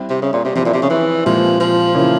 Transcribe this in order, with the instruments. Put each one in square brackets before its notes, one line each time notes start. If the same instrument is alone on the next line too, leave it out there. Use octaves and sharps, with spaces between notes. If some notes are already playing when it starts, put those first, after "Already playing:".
Already playing: [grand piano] G3 C4 E4
[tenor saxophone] C3
C#3
A#2
C3
[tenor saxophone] C3 [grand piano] F3 C4 E4
[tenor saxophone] A#2
C3
C#3
E3
[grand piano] A#2 G#3 C4 G4 [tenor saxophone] F3
[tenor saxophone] F3
[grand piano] C#3 E3 A#3 C#4 E4